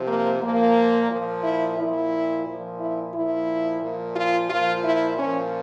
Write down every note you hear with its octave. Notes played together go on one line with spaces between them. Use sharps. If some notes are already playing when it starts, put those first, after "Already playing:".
Already playing: C3 F3
A#3
A#2 F3 A#3
A#2 F3
E4
A#2 F3 E4
A#2 F3
E4
A#2 F3 E4
A#2 F3
F4
A#2 F3 F4
E4
A#2 F3 C#4